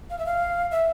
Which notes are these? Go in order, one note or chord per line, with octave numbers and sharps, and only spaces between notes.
F5
E5
F5
E5